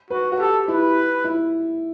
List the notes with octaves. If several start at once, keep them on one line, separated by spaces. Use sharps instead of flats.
F#4 B4
F#4
G4 A4
E4 B4
E4